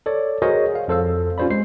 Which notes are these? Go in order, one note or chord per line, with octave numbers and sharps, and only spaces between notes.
A4 C#5 D5
F#4 G#4 A#4 C5 C#5 D#5
F5
F2 A4 C5 F5 E6
C#4 F4 G4 C5 D5 B5
G#3 C5 C7